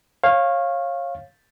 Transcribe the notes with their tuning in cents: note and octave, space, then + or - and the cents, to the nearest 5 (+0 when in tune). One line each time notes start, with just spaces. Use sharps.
C#5 -25 F5 +0